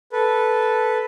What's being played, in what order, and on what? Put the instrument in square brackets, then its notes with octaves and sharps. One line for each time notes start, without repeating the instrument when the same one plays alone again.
[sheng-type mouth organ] A4 B4